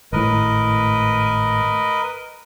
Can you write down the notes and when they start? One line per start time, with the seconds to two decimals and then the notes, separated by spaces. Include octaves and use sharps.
0.13 G#1 A2 A#4 B4 D#5